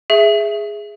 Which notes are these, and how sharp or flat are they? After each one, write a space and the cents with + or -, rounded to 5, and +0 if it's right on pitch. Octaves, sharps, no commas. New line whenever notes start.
G#4 +0 E5 +5